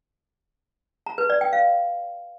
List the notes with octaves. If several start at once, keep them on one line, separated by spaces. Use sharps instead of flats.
A#5
B4
D5
G5
F5